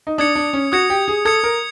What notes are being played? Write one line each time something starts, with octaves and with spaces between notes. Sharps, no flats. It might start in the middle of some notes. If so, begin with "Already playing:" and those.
D#4
D4 D#6 G#6 C#7
D4
C#4
F#4 D#6 G#6 C#7
G4
G#4
A4 D#6 G#6 C#7
A#4